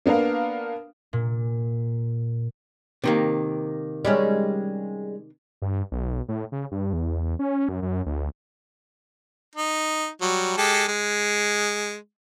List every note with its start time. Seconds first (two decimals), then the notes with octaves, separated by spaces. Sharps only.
0.06 A#3 B3 D4 A#4 F5
1.13 A#2
3.04 C3 D#3 A#3
4.05 G3 G#3 C#4
5.62 G2
5.92 B1
6.29 A2
6.52 C#3
6.72 G2
6.93 E2
7.39 C#4
7.69 F#2
7.82 F#2
8.06 D2
9.55 D#4
10.22 F#3 G3
10.58 G#3 G4 A4
10.88 G#3